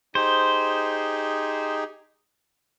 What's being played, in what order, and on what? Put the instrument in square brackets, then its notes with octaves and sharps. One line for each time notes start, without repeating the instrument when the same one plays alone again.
[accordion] D#4 G4 G#4 [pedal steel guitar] C5